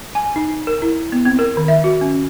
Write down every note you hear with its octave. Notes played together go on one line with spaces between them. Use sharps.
G#5
D#4
A#4
E4
B3
C4
A#4
D#3
E5
F#4
C#4